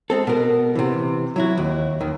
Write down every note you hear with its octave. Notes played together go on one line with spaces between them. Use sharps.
G#3 C4 A4
B2 A#4
C3 E3
F#3 E4 F#4
D#2
D#2 D#3